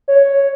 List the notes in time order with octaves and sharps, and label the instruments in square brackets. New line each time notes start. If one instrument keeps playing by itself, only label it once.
[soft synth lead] C#5